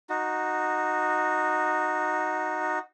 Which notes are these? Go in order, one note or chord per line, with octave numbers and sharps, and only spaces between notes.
D#4 F#4